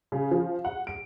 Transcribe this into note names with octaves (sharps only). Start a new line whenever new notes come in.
C#3
F3
F#5
D7